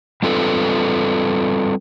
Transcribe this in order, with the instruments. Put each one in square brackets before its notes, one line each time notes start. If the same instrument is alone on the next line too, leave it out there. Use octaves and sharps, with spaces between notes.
[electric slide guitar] G3 C4 F4 A4 B4